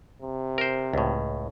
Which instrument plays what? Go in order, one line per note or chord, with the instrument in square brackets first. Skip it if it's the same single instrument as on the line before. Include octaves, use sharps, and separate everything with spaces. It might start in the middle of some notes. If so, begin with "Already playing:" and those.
[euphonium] C3
[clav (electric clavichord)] A#4 C5
C#2 A2